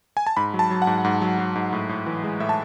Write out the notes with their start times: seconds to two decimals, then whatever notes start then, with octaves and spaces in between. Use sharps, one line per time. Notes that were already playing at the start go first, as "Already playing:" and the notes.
0.17 G#5
0.27 A5
0.37 G#2 B5
0.54 F#3
0.59 A5
0.71 F#3
0.82 F#5
0.87 G#2
1.05 G#2
1.22 F#3
1.38 F#3
1.55 G#2
1.73 A2
1.89 A2
2.06 E3
2.24 G#3
2.40 A2 E5
2.49 A5